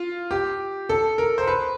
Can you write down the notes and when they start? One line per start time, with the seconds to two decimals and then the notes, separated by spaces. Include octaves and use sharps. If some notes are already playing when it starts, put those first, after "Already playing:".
Already playing: F4
0.31 G4
0.89 A4
1.18 A#4
1.38 C5
1.47 B4